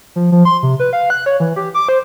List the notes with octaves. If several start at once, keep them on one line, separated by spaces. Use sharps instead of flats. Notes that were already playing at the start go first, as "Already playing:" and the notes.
F3
F3
C6
C3
B4
F5
F#6
C#5
E3
G4
D6
C5